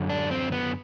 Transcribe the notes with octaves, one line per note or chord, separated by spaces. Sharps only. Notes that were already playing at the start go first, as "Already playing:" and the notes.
Already playing: F#2 D3
D4
C4
B3